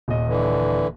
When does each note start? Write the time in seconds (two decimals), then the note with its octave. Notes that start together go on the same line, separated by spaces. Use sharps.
0.08 D#1 D#5
0.27 D3 E3